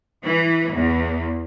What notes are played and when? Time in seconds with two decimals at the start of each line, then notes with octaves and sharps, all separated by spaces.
0.24 E3
0.73 E2